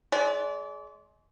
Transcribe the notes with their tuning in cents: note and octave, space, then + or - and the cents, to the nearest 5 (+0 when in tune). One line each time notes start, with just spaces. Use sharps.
G#3 +25 D5 -35